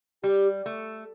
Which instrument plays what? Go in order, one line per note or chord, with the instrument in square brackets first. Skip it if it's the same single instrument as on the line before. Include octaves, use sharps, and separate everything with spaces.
[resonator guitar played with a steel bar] G3 [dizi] G4
[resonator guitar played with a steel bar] A3